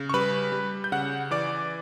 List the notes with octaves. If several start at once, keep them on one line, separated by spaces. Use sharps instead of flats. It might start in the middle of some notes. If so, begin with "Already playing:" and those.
Already playing: C#3
C#6
G3 B4 B5
G3
G6
C#3 F#5 F#6
E3 D5 D6